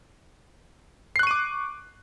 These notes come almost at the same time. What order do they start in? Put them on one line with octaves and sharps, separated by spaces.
C7 F#6 C#6 D#7 D6